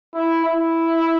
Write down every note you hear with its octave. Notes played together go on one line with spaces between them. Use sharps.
E4
E4